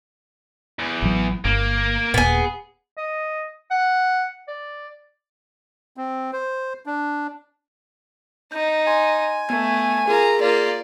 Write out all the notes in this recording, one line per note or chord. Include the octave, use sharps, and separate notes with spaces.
E2
A1 F#3
G1 A#3
D#1 A#2 B3 G#4
D#5
F#5
D5
C4
C5
D4
D#4 G6
G#5 C6
A3 B3 G#6
F4 G#4 A#4 A#5
A#3 F4 D5